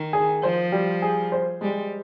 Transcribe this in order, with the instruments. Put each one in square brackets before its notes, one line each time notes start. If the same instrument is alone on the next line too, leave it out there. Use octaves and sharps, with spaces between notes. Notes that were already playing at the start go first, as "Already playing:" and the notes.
Already playing: [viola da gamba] D#3
[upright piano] G#4
[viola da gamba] F3 [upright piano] C5
[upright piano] G3
G#4
C5
[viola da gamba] G3 [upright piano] G#3